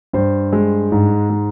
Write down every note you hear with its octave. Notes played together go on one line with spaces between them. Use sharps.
G2 C5
G#3
G#2
G#3